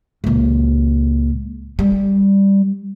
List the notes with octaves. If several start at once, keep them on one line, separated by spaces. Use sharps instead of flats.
C#2 A#2
G3